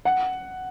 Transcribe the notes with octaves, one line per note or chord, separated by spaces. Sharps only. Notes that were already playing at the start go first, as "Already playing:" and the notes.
F#5